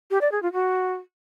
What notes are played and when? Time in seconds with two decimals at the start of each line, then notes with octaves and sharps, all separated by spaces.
0.11 G4
0.21 D5
0.32 G#4
0.42 F4
0.53 F#4